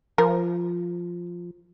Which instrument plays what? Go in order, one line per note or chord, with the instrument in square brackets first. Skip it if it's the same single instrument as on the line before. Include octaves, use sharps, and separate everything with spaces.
[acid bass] F3 [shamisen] A#4